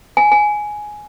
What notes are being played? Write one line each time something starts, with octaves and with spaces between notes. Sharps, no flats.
G#5
G#5